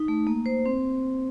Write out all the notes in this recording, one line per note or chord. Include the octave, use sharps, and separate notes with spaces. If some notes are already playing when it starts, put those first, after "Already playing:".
Already playing: D#4
A3
A#3
C5
C4